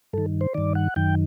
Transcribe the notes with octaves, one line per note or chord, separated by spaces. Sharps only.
G2 D#3 A4
C5
G2 D#3 D5
F#5
F#2 D#3 G5